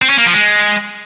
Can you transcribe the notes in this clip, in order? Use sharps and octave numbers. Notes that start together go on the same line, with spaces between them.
C4
C#4
A#3
F3
G#3